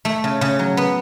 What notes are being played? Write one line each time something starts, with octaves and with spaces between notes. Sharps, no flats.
A3
C#3
C#3
F#3
B3